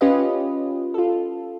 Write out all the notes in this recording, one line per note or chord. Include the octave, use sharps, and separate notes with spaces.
C#4 F4 G4 B4 D#5
F4 A4